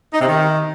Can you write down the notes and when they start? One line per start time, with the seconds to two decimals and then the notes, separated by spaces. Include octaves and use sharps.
0.13 D#4
0.20 C3
0.27 D#3